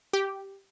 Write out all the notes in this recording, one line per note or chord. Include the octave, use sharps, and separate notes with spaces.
G4